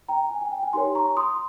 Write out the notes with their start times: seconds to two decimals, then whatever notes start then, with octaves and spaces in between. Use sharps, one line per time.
0.08 G5 A#5
0.31 G#5
0.41 G#5
0.52 G5
0.63 G#5
0.73 D#4 G4 A#4 C#5 G#5 C6
0.95 A#5 C#6
1.17 C6 D#6